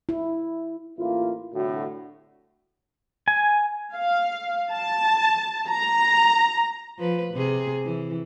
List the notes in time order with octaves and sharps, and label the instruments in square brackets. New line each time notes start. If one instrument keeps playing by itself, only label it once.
[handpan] E4
[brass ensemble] A1 A#3 E4 [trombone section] F4
[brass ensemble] C2 A2 D3 [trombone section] F#4
[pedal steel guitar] G#5
[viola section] F5
A5
A#5
[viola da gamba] F3 B4
C3 G#4
E3